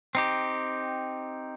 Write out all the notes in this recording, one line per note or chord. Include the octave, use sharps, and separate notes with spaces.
C4 D#4 G4